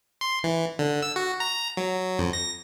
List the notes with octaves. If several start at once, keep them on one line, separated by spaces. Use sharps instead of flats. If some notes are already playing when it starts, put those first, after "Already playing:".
C6
E3
D3
E6
F#4
A#5
F#3
F2
A#6